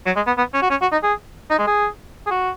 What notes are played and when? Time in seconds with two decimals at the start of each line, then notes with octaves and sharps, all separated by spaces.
0.06 F#3
0.16 G#3
0.27 B3
0.38 B3
0.54 C#4
0.62 F#4
0.70 C#4
0.82 F#4
0.92 D#4
1.03 G#4
1.50 D#4
1.59 G#3
1.67 G#4
2.27 G#4
2.31 F#4